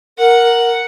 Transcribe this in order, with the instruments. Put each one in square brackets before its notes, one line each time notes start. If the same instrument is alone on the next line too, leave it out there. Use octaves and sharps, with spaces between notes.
[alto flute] A#4 [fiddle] F#5